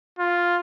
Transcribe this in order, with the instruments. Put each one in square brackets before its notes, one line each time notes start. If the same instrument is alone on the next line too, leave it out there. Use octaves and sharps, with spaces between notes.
[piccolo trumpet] F4